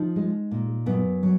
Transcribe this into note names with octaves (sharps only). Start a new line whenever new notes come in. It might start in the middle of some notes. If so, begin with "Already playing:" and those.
Already playing: F3 D#4
G#3
A#2
F#2 B3
F#3